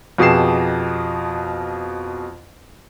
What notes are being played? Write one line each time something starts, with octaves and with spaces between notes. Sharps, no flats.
F2 B2 G4 G#4 C7 E7